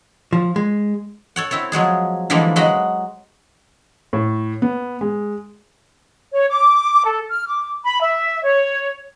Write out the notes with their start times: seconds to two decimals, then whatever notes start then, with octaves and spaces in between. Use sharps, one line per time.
0.33 F3
0.56 G#3
1.36 A4 C#5 F#5
1.51 C4 E4 A4 C#5
1.72 F3 F#3 G#3 G#4
2.30 D3 E3 F3 G3 G#3 A#3
2.56 F#3 G#3 F#4 D#5 B5
4.13 A2
4.62 B3
5.01 G#3
6.33 C#5
6.49 D6
7.04 A4
7.29 F6
7.47 D6
7.84 B5
8.01 E5
8.43 C#5